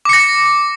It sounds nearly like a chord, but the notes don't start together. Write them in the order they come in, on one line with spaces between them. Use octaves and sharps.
D6 C#7 A#6